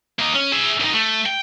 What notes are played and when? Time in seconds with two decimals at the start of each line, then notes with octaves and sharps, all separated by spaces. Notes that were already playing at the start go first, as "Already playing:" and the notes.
0.19 A#3 D#4
0.34 C#4
0.52 G#4 E5
0.80 C2 D#4
0.94 A3
1.26 G5